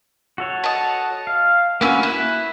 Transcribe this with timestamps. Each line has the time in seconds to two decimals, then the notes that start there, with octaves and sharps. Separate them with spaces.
0.38 F#4 A4 C#5
0.64 D#5 A5
1.27 F5
1.81 A#3 B3 C#4 F#4 E6
2.03 E4 F#6